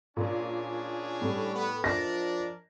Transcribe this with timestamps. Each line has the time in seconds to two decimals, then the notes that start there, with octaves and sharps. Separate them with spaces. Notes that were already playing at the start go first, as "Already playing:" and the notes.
0.17 A#2 C#4 D4 G#4
1.22 A2 G3
1.55 B3
1.84 F3 D4 A#4 D5 D#5 A#6